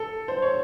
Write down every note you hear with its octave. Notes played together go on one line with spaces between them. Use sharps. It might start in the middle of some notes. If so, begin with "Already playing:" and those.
Already playing: A4
C5
C#5